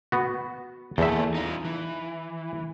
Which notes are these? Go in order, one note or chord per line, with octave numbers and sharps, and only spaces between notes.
B3 F#4
E2 A#3 A4 E5
D#4 F4
E3